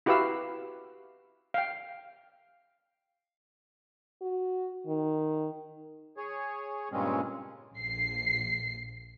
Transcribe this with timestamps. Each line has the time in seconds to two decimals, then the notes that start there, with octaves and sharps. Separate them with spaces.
0.06 E4 F#4 G4 B4 F5 E6
1.54 F5 G5
4.21 F#4
4.87 D#3
6.17 G#4 C#5
6.92 G2 A#2 C#3 G#3 C4 C#4
7.75 A#1 C7